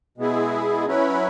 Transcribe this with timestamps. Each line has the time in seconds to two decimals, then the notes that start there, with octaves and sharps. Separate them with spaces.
0.18 B2 G#3 B3 E4 G#4
0.86 F#3 C#4 E4 B4